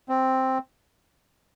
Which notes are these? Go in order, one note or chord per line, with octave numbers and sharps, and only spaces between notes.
C4